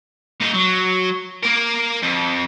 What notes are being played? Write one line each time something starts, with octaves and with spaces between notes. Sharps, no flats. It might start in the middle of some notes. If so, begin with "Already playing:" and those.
A#2 D#4
F#3
A#3 A#4
F2